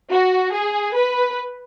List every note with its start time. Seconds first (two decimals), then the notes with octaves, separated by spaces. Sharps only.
0.11 F#4
0.53 G#4
0.96 B4